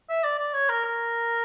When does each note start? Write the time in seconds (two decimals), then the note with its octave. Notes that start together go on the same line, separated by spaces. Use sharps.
0.09 E5
0.24 D5
0.39 D5
0.53 C#5
0.69 A#4
0.84 A#4